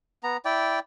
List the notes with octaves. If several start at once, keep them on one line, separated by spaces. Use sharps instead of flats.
B3 A#5
E4 D5 G5